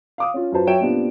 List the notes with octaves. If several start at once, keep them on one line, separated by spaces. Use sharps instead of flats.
F5 D6 D#6
C#4 F4
F#2 F4 F#4 B4 C5 A5
F#3 C#5 E5 G5 D7 E7
A#2 B3 C4 D4 F4 G4